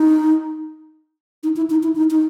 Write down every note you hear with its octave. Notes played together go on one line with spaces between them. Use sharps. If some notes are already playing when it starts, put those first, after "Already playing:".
Already playing: D#4
D#4
E4
D#4
E4
D#4
D#4